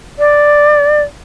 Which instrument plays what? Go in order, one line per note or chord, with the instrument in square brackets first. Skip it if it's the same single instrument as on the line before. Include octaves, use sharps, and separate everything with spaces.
[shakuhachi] D5